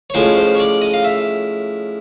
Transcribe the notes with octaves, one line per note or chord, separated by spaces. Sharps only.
C#5
A2 F3 G#3 C#4 C5
C5
C#5
D5
D#5
F5
E5